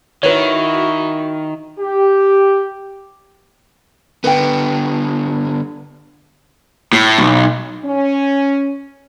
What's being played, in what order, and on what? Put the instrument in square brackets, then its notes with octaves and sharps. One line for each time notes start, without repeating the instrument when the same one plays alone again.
[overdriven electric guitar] D#3 [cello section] E4 F#4 [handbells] B4 C#5
[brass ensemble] G4
[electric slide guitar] D3 B3 [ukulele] B4 G5
[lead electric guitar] A2
B1
[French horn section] C#4